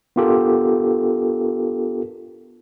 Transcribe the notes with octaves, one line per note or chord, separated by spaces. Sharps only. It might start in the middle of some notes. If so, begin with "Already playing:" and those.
B3 D4 F4 G4 A4 A#4